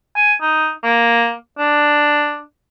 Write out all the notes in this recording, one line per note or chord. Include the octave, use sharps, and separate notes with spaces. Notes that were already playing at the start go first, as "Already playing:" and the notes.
G#5
D#4
A#3
D4